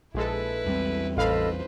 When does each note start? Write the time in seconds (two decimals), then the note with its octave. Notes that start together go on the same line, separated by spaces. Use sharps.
0.14 A#1 G#3 E4 A4 B4
0.66 E2 G3 C4
1.17 A1 A4 B4 C5 D#5 F5 B5